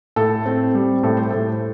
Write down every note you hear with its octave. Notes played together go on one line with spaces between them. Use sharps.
A2 A4
C4
G3
A2 A4
C5
A2 A4